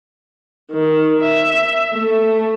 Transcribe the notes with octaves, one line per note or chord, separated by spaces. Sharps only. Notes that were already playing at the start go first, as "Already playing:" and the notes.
D#3
E5
A3